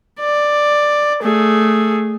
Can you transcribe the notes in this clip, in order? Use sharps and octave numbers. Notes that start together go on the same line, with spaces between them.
D5
A3 G#4